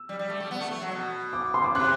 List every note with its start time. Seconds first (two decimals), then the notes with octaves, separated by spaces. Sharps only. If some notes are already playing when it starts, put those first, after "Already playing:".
Already playing: E6
0.09 G3
0.19 G3
0.30 A3
0.40 G3
0.51 B3
0.61 A3
0.71 A3
0.82 F#3
0.92 B2
1.33 D6
1.54 C6
1.64 D6
1.75 C3 F#6